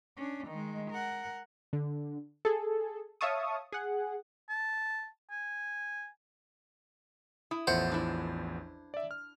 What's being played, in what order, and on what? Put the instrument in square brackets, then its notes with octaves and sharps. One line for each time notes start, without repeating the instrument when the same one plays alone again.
[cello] C#4 D4
D#3 G#3
A#4 F#5
[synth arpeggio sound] D3
G#4 A4
C#5 E5 F5 A5 C#6 D#6
G#4 F#5
[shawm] A5
G#5
[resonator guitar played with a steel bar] E4 [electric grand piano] D#6
[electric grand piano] A1 E2 F3 [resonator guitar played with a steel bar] A3 F#5 [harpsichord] C5
[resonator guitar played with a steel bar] D4 E4
[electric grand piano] D5 E5
F6